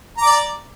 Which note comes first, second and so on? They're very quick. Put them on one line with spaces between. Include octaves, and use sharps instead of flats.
A#5 D6 D5